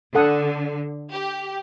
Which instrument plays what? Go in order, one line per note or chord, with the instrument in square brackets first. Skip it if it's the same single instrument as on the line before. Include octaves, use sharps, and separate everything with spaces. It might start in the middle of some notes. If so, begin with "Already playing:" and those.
[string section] D3 [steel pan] A4 F#5 D#6
[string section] G4